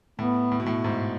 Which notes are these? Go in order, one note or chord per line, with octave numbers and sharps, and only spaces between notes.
A2 B3
A2
B2
A2
G#2